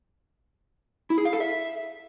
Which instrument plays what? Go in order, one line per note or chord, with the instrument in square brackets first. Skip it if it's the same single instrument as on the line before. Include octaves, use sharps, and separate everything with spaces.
[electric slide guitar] E4
G#4
F5
A4
E5